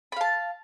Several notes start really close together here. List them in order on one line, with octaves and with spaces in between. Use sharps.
B5 F5 A5